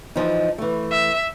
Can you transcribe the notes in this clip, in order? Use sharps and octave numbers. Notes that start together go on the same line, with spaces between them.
E3 F3 D#4
E3 A3
E5